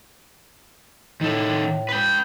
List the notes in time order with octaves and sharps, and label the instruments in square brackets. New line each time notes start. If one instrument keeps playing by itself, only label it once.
[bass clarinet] A2 [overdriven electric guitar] D#3 A4
[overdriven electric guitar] B4 G5